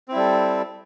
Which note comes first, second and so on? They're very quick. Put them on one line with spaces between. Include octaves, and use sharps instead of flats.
C4 E4 G3 A4